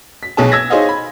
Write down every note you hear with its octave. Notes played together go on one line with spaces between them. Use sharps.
B6
B1 B2 G#4 C#5 A5
E6 G#6 A#6 B6
D#4 G#4 C5 C#5 D#5 F5
B5